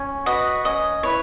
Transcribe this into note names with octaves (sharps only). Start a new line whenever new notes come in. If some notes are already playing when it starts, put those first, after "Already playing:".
Already playing: C#4
F#4 B4 D#5 F#5
C#4 D#5
E4 B4 C#5